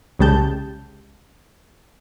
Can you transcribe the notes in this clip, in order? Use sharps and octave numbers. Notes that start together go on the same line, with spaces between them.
C2 C#3 G#3 G4 A5 G6